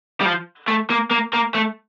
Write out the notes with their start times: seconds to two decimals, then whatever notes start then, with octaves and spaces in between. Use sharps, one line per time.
0.21 G3
0.25 F3
0.68 A3
0.90 A#3
1.11 A#3
1.33 A#3
1.54 A3